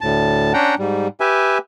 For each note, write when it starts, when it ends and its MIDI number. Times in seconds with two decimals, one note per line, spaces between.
0.01 0.53 38
0.01 0.53 45
0.01 0.53 81
0.54 0.75 61
0.54 0.75 62
0.54 0.75 78
0.54 0.75 79
0.54 0.75 82
0.79 1.08 44
0.79 1.08 55
1.20 1.58 67
1.20 1.58 71
1.20 1.58 76
1.20 1.58 80